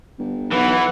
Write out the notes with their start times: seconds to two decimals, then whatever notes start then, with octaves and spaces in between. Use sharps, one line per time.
0.19 G1
0.51 B1 E3 B4 F#5